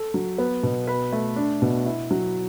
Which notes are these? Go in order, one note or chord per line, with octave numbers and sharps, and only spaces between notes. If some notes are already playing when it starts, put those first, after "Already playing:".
Already playing: A4
F#3
B3
B2
B4
A3
D4
B2
E4
F#3